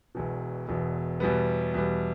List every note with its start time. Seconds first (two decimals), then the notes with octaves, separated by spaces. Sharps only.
0.15 E1 E2 B2
0.68 E1 E2 B2
1.20 E2 B2 G3 B3
1.74 E2 B2 G3 B3